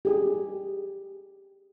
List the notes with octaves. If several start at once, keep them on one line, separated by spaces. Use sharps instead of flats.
G4 G#4